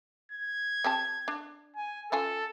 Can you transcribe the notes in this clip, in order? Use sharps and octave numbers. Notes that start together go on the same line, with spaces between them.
G#6
C4 G4 A5
D4
G#5
C#4 F4 A4 G#5